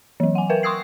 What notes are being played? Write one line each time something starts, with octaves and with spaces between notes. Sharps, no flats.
E3 F#3
F#5 G#5
A#4 B4 E5 G5
C6 C#6 D#6 E6 G#6 C7